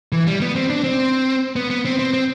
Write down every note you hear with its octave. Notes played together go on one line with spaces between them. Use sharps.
E3
G3
B3
C4
D4
C4
B3
B3
C4
C4
C4